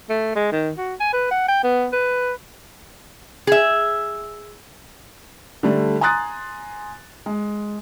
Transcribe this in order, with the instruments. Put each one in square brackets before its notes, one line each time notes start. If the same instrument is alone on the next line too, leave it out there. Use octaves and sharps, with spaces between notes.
[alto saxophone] A3
G#3
D#3
F#4
G#5
B4
F#5
G5
B3
B4
[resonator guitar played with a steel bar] G#4 E5
[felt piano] D3 G3 A3
G#5 A#5 C6 D#6 F#6 A6
G#3